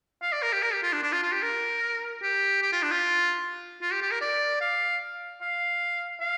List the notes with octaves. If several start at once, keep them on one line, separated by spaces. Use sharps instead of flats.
F5
D5
A#4
G4
A#4
G4
F4
D4
D4
F4
F4
G4
A#4
G4
G4
F4
D4
F4
F4
G4
G4
A#4
D5
F5
F5
F5